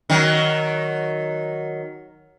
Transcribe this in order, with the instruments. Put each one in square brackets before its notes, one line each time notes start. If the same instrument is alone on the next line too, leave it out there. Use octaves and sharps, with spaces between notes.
[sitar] D#3 F#3